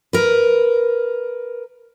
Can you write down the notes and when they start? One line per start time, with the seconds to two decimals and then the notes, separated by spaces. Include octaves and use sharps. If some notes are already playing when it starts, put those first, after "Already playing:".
0.13 A#4 B4